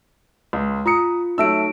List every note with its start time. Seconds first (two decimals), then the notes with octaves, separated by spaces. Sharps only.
0.53 C#2
0.86 F4 A#5 D#6 C#7
1.38 F#3 A3 D#4 E5 E6 D7